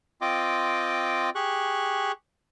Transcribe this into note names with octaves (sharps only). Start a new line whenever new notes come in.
C4 F4 D#5 G5 D6
G4 G#4 C#6 F#6